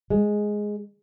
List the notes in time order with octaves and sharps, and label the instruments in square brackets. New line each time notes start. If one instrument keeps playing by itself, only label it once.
[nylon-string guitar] G#3